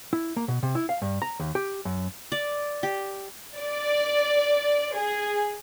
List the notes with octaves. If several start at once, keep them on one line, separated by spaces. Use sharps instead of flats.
E4
A#3
B2
C3
E4
F5
G2
A#5
D#2
G4
F#2
D5
G4
D5
G#4